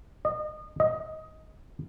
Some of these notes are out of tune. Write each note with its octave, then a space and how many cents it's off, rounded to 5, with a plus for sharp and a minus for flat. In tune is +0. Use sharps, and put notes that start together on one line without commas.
D#5 -30
D#5 +15